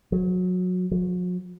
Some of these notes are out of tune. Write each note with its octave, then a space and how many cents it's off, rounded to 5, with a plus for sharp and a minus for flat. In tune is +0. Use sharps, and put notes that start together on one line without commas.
F#3 -25
F#3 -45